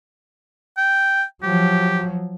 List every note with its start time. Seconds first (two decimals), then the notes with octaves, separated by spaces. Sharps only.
0.77 G5
1.43 F3 F#3 G4